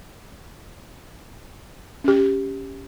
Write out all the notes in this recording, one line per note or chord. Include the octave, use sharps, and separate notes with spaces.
C#4 G4